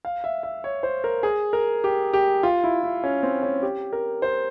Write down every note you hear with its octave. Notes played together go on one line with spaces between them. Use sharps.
F5
E5
E5
C#5
C5
A#4
G#4
A#4
G4
G4
F4
E4
E4
C#4
C4
C#4
G4
A#4
C5